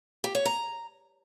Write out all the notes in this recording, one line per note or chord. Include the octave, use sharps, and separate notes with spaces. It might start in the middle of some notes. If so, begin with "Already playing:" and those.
G4
C#5
A#5